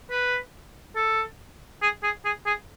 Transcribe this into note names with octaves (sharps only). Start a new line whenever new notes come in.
B4
A4
G#4
G#4
G#4
G#4